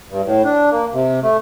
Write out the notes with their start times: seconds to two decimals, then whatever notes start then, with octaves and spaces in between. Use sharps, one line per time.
0.09 G2
0.25 A2
0.44 D4
0.71 A#3
0.93 C3
1.22 A3